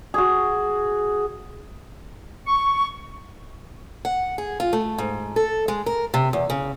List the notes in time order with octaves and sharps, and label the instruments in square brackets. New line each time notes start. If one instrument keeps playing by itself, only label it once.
[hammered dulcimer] F#4 G#4
[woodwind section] C#6
[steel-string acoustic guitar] F#5
G#4
F4
A3
G#2
A4
G#3
A#4
C3
E2
C#3